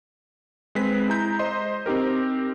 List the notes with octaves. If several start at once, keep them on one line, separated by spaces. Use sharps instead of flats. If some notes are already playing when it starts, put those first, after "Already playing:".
G#3 C4 B4 B6
G#3 E4 A#5 G6
C5 D#5 C6
C4 D#4 G4 A#4